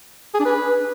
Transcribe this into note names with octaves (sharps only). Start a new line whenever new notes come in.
G#4
D4
B4